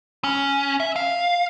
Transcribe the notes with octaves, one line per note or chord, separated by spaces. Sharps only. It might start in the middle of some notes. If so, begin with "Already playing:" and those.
C#4
E5
F5